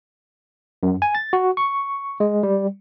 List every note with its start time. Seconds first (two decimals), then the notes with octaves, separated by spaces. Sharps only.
0.83 F#2
1.02 G#5
1.15 A6
1.33 F#4
1.57 C#6
2.20 G#3
2.43 G3